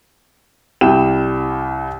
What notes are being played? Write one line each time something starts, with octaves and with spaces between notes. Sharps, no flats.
C2 E4 G5 E7